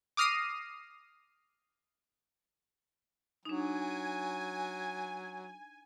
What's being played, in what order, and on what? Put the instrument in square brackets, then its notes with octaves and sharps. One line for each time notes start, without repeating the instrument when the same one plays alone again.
[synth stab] D6 D#6 F6 A#6 C7 D#7
[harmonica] F#3 [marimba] D4 D#4 [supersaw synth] G#5